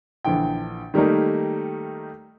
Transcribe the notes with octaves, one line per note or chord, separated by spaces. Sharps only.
A#1 D3 E3 G5
D#3 G3 A3 A#3 D#4